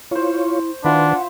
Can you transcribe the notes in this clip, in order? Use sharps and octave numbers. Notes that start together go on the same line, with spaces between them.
E4 F4 C5 C#5 C#6
D#3 D4 E4 F4 B4 E5 F#5